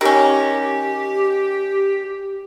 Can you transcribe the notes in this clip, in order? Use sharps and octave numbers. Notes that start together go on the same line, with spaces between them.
D#3 C#4 G4